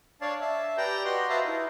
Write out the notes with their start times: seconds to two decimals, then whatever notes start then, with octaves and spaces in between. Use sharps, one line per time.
0.21 D4 C#5 D5 F5 A5
0.41 E5 A5
0.77 G4 B4 D5 G5 A#5 G6
1.05 F#4 D#5 C6
1.29 B4 C5 E5 F5 A5 A#5
1.46 D#4 E4